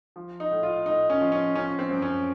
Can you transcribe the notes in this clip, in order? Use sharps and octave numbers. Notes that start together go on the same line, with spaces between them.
F3
D#4
A2
F4
A2 D#4
C#4
F3
C#4
F3 C#4
C4
F#2
C#4